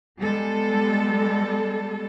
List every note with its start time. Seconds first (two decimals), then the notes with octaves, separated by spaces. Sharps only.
0.21 G3 G#3 B3 A4